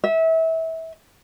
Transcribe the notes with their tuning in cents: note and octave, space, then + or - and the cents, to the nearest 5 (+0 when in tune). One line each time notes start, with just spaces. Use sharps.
E5 -25